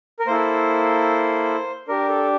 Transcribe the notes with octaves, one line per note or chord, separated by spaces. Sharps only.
A#4
A#3 E4 A4 C5
D4 G4 A#4
A4